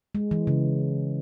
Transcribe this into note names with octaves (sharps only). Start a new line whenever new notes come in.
G#3
E3
C#3